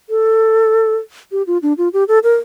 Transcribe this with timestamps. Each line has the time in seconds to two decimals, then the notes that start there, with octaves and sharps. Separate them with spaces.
0.10 A4
1.32 G4
1.47 F4
1.63 D4
1.78 F4
1.93 G4
2.08 A4
2.24 A#4